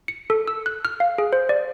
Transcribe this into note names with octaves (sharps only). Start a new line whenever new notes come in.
C#7
A4
E6
F#6
F6
F5
G#4
C5
D5